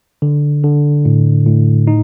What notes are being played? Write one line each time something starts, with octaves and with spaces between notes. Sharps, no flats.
D3
D3
A2
A2
D#4